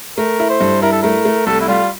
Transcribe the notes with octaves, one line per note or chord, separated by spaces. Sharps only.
A3 A#4
E4
C5
G2
E4 A#4
A4
A3 A#4
A3
C2 A4
E4
G3 F4